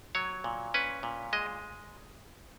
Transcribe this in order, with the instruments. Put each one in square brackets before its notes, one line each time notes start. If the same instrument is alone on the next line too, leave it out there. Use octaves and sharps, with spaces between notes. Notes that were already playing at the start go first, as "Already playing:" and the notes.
[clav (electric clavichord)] F#3 C#5
A#2
C#4 B4
A#2
G#3 D#5